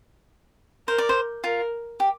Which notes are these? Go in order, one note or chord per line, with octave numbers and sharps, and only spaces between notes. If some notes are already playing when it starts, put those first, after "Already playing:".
A#4 C5
D5
C5
F4 A#4
G4